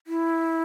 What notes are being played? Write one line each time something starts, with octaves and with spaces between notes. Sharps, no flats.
E4